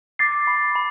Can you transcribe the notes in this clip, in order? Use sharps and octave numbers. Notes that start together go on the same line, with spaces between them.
D6 A6 C7
B5
B5